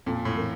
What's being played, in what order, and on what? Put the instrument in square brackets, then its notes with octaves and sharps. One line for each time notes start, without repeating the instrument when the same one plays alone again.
[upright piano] F2 [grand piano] A#2
[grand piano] A2
[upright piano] E3 A#3